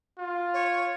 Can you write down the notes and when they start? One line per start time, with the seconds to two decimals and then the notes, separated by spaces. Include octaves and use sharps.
0.18 F4
0.53 C#5